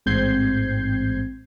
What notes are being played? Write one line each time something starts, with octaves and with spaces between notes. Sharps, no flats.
A1 G#2 C4 G6 G#6 C7